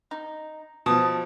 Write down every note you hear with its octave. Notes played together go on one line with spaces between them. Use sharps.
D#4
B2 F3 A5 D#6